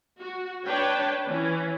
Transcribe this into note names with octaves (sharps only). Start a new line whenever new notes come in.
F#4
D4 B4 C#5 G5 A5
E3 C#4